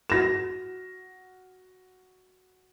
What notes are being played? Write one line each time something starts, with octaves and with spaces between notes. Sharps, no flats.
F#4 A#6 E7